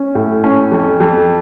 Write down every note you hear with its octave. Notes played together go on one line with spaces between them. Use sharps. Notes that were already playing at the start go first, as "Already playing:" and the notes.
Already playing: C#4
A2
C#4
F2
F2